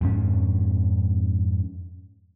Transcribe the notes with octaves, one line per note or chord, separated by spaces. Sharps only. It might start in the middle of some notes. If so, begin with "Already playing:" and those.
F2 G#2 C#4